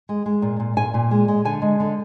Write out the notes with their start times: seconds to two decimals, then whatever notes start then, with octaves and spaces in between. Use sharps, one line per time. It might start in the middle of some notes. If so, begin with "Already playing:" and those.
0.09 G#3
0.26 G#3
0.42 A#2
0.60 A#2
0.77 A#2 G#5
0.94 A#2
1.11 G#3
1.28 G#3
1.45 D3 G#5
1.62 G#3
1.80 D3